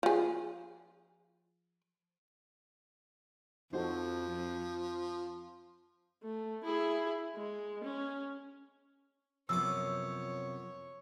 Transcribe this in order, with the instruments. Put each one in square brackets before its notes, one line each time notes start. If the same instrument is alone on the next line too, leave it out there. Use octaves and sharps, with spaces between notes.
[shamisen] F3 G#4
[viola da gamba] F2 [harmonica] F3 [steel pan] D#4 F#4 A4 [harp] C5
[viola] A3
E4 G#4
G#3
C#4
[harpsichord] F#2 B3 D6 [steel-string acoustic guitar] C3 F3 [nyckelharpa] C#5 [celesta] E6